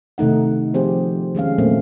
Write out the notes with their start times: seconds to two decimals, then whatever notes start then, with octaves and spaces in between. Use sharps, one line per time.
0.18 C3 D#3 A3 D#4 F#5
0.74 F3 C4 G4 G#4 C5
1.35 D#3 G#3 C#4 F5
1.58 A#2 F#3 A3 A#3 C4